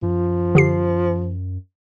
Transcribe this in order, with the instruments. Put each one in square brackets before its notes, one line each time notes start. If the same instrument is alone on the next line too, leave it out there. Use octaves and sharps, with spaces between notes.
[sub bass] F#2 [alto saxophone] F3
[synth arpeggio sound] D3 G4 C7